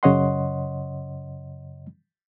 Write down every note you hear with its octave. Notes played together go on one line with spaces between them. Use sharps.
F#2 C#3 C#5 D#5 F#5 C6